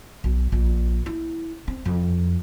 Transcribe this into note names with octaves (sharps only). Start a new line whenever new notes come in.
B1
A#1
E4
C4
F2